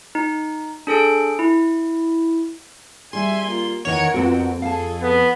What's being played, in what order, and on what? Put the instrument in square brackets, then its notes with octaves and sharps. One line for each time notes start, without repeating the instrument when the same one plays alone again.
[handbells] D#4
D4 G#4 A4 D7
E4
[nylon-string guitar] G3 G#4 [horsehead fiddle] E5 G#5 [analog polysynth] C6
[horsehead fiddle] A#3 F4
[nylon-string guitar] E2 D#3 D#5 [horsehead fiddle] A#4 F#5 [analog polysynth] C#5
[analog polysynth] F2 [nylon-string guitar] B3 C4 F#4
[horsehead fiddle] G#4 A4 [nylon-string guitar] F5 A5
[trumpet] B3